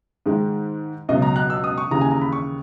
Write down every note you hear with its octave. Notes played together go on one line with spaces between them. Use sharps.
G#2 D#3 G#3
C#2 B2 F#3 D#5
A#5
F#6
E6
D#6
C#6
D#2 C#3 E3 A#5
G#5
A#5
B5
C#6